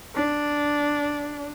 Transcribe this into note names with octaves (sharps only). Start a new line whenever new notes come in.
D4